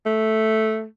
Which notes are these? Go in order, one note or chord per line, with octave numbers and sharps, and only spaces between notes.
A3